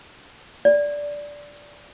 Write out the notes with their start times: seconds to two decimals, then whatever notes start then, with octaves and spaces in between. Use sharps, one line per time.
0.65 D5